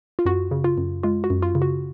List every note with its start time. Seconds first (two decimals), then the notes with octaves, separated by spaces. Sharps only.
0.19 F4
0.26 F#2 F#4
0.51 C#3
0.64 F4
0.78 F#2
1.03 G#3 F4
1.24 F#4
1.30 F#2
1.42 F4
1.55 C#3
1.62 F#4